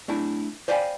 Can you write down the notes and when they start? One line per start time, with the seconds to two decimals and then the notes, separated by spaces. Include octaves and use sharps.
0.08 A3 D4 E4
0.68 C5 D5 F5 G5 G#5 B5